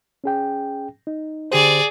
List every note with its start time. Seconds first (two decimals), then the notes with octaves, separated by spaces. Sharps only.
0.24 C#4 G#4 G5
1.07 D#4
1.52 D3 G4 G#4 C5 D5